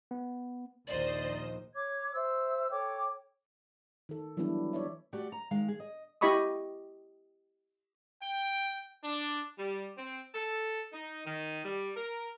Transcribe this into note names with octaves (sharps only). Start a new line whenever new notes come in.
B3
A#1 D#2 C5 D5 D#5
C#5 D6 G#6
C5 E5 E6
A4 C#5 G5 D6
D#3 A4
E3 F#3 G3 B3 D4 E4
E4 C#5 D5 E5
A3 F#4 G4 D5
A#5
D#3 G#3 F5
G#4
D#5
E4 G4 D#5 B5 C#6 D#6
G5
D4
G3
C4
A4
D#4
D#3
G3
A#4